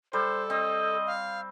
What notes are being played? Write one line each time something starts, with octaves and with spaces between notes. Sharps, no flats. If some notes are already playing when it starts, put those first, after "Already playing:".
G3 A4 C5
C4 D#5
F5